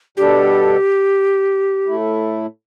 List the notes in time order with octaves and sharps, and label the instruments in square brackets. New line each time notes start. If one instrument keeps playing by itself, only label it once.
[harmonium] B2 G3 D4 A4 [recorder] G4
[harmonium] A2 A3 E4